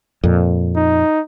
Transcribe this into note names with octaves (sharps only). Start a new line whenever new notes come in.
F2 A#2
D#4